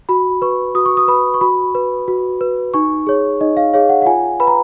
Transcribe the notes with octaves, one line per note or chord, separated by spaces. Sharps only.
F#4 B5
B4 C#6
F#4 D#6
C#6
D#6
B4 B5
C#6
F#4 B5
B4
F#4
B4
D#4 C#6
G#4 C#5
D#4 D#5
F5
G#4 C#5 F5
F#5
F#5
F4 G#5
B4 B5
A#5